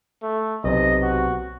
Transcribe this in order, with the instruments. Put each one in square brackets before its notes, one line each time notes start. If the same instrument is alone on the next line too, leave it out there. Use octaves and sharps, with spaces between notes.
[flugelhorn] A3
[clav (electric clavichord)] B1 C3 [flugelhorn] D#5
[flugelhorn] F#4